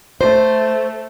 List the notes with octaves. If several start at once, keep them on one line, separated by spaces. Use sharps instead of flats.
A3 C5